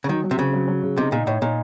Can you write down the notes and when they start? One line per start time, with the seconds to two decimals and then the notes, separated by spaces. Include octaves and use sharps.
0.04 C#3
0.08 D#3 F#3
0.24 F#3
0.31 C3
0.38 C#3 C4
0.53 F#3
0.68 F#3
0.82 C#3
0.97 C3 D#4
1.12 A#2 D#4
1.27 A2 C#5
1.42 A#2 D#4